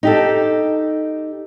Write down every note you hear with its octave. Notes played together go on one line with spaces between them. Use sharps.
D#4 G4 A4